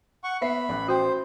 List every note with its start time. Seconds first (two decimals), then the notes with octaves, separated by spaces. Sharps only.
0.24 F#5 C#6
0.41 B3 E5 B5 C7
0.69 A1 F#6
0.88 F#4 C5 G5